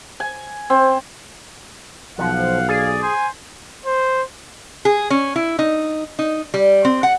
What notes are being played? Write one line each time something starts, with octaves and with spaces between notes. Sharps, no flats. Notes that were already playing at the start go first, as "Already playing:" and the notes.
G#5
C4
B1 F3 F5 F#5
G#4 D5
C5 G#5
C5
G#4
C#4
E4
D#4
D#4
G3
C4
F#5